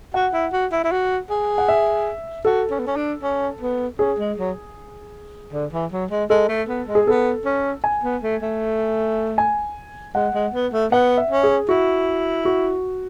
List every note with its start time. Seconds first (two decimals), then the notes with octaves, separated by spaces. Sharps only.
0.14 F#4 F#5
0.33 E4
0.53 F#4
0.72 E4
0.84 E4
0.92 F#4
1.30 G#4
1.58 F#5
1.68 E5
2.45 F#4 A4
2.70 C#4
2.79 B3
2.87 C#4
2.96 D4
3.23 C#4
3.61 B3
3.99 C#4 G#4
4.19 G#3
4.38 F#3
5.53 D3
5.72 E3
5.92 F#3
6.11 G#3
6.30 G#3 A4
6.49 A3
6.69 B3
6.88 G#3
6.95 G#4
7.07 B3 A4
7.45 C#4
7.84 G#5
8.04 B3
8.23 A3
8.42 A3
9.38 G#5
10.15 G#3 F#5
10.34 G#3
10.54 B3
10.73 A3
10.92 B3 F#5
11.17 E5
11.31 C#4
11.43 G#4
11.69 E4 F#4
12.45 F#4